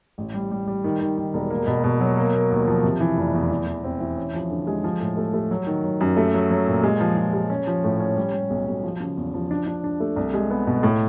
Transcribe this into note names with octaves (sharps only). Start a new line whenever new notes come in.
A1
G3
G3
G3
D#3
D#3
D#3
E1
A#3
B2
B2
F#3
A#3
A#3
D#2
F3
C3
E3
F1
E2
E3
E3
C4
E3
C#4
F3
D3
G#3
F3
A2
A3
A3
F#3
D#3
F#3
F#2
A3
F#3
F#3
A#2
G#3
F3
F3
G#3
C#4
F3
A2
C#4
G3
G3
B1
B1
F3
C#3
E2
F3
D4
D4
D4
A3
C2
G#3
B3
B2
A2